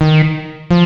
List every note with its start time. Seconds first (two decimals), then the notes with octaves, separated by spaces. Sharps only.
0.01 D#3
0.71 F3